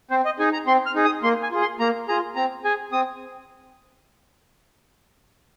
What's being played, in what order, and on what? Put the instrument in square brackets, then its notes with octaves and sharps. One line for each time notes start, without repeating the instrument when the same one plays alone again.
[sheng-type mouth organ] C4 C5
D#5
D#4 G#4 G#5
A#5
C4 C6
F6
D#4 G#4
D#6
A#3 C6
G#5
F4 G#4
C6
A#3 A#5
F4 G#4 A#5
C4 A#5
G#4 G#5
C4 D#6